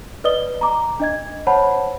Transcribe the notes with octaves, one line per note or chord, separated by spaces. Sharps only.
B4 D5 D#5 D#6 G7
A#5 D6
D4 D#5 G#6
C5 C#5 F#5 A5 B5